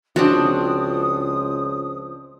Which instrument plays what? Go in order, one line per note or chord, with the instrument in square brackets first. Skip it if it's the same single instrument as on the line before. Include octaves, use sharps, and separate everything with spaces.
[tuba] C#2 [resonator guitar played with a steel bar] F3 C4 D4 [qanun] F#4 [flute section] D#6